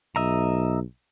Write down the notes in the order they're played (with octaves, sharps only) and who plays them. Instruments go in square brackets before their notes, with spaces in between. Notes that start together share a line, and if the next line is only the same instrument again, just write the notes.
[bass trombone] B1 [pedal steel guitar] D#5 E5 A#5